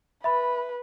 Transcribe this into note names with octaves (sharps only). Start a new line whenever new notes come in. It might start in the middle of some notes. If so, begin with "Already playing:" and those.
B4 E5 B5